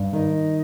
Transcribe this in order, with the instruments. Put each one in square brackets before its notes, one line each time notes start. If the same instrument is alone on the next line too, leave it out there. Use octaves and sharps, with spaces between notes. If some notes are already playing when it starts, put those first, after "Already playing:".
Already playing: [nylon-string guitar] G2
[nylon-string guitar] D#3 [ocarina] D#5